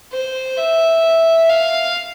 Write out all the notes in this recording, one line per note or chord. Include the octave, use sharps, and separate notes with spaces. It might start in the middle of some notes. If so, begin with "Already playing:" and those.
C5
E5
F5